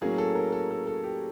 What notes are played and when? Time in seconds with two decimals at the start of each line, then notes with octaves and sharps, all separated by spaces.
0.01 A2 F#3 A#3 C#4 G#4
0.18 A4
0.35 A#4
0.52 A4
0.71 A4
0.87 A4
1.04 G4